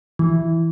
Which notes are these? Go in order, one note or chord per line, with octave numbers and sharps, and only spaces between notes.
E3